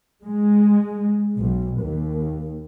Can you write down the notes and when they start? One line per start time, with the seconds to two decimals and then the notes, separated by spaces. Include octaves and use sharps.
0.24 G#3
1.37 B1
1.79 D#2